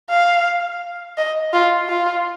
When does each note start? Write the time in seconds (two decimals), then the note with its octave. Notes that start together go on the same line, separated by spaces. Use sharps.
0.10 F5
1.17 D#5
1.53 F4
1.89 F4